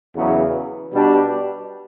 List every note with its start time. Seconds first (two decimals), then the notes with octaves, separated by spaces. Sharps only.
0.15 E2 C#3 F#3 B3
0.92 B2 G3 D4 G4